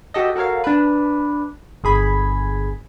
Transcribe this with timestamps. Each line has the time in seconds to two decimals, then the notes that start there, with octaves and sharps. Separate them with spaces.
0.14 F#4 G4 A4 D#5
0.36 F#4 A4 A#4 C#5 F5
0.64 D4 B4
1.84 G1 G#4 B5 G#6